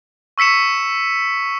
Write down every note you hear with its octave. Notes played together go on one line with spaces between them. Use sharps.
C#6 E6 B6 C#7 E7